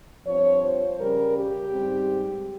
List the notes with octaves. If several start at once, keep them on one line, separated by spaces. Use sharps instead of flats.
G2 F3 C4 C#5
C5
C#3 G3 C#4 A#4
G4
G#2 G3 C4